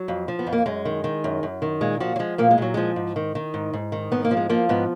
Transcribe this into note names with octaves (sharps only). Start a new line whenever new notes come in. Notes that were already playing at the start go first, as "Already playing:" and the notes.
Already playing: F#3
F2
F3
B3
F2
A#3
F#2 G#3
D#3
D#3
F#2
F#2
D#3
A#2 G#3
F3 F#4
F#3
F3 G#3
A#2 A#3
G#3
A#2 F#3
F3 G#3
G#2
D#3
D#3
G#2
G#2
D#3
G#2 B3
A#3
F3
G#3
F3 A#3
G#2 B3